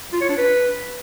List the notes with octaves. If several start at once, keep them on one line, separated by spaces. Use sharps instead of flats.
F4
C#5
D4
B4